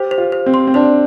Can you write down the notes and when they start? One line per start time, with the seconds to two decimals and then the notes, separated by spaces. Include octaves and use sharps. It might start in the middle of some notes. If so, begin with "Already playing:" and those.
Already playing: G4 C5
0.11 C5
0.18 F4
0.32 C5
0.46 C4
0.54 C6
0.67 C4
0.74 D4 C5